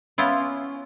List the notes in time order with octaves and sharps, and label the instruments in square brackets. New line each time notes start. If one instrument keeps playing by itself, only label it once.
[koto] B3 E4 F4 [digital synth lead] C#4